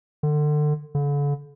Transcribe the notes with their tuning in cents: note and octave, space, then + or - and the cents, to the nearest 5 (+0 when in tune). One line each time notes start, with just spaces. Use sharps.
D3 +30
D3 -40